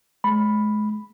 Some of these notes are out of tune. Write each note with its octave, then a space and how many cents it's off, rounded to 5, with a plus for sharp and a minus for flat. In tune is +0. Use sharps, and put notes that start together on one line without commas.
G#3 +35 B5 +0